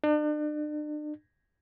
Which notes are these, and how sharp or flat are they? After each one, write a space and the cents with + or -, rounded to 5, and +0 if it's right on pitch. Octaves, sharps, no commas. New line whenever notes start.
D4 +40